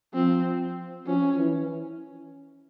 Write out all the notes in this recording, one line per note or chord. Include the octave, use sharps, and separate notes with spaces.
F3 C4
F3 C#4
E3